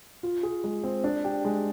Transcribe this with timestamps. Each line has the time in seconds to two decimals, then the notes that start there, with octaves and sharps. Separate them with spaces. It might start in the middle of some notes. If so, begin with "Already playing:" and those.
0.23 F4
0.43 G#4
0.64 G#3
0.84 C4
1.04 D4
1.24 G4
1.45 G#3